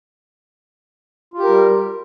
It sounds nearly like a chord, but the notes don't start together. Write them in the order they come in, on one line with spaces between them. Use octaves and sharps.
F4 G4 A#4 G3